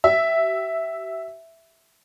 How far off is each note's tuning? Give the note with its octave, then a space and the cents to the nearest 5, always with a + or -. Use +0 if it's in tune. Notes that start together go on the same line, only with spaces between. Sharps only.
G4 -40 E5 +0